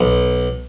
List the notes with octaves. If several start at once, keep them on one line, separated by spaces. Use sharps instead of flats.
B1